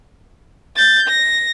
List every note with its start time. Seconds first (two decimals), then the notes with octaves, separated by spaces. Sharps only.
0.76 G6 A6
1.08 A#6